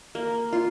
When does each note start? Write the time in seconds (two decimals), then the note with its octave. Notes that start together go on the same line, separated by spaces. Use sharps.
0.15 A#3
0.53 F4